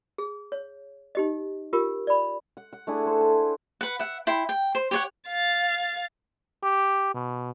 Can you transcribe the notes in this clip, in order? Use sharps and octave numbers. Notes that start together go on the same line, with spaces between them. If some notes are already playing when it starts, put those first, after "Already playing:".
G#4
C#5
D#4 G4 D#5
F4 G4 A#4
D5 B5
F#5
F#5
A3 D4 E4 G#4
A4 C5
G#5
B4 F#5
E5 F#5
E4 G5 C6
G5
C5
G4 C#5 F#5
F5 A6
G4
B2